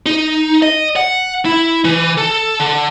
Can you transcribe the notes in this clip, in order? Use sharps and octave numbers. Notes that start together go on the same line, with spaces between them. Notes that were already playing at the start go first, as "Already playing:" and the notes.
D#4
D#5
F#5
E4
E3
A4
D3